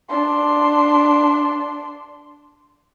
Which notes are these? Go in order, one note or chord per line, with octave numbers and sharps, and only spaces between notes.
D4 C6